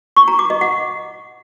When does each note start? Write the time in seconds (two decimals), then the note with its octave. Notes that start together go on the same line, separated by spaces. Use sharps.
0.16 C#6
0.28 A#5
0.39 D6
0.50 D#5
0.61 F#5